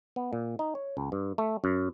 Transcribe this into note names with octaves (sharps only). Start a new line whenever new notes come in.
B3
A#2
D#4
C#5
C#2
G2
A3
F#2